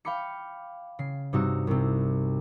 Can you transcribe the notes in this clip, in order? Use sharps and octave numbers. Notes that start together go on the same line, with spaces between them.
F5 G5 B5 D6 C#7
C#3 C7
G2 C3 D#4 F#4 E6
C2 C3